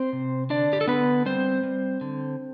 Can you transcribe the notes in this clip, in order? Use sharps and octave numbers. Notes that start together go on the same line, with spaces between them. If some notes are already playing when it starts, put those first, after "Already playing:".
Already playing: C4 C5
C3
D3 D4 D5
G4
A4
D3 B3 B4
G3 C4 C5
G3
D3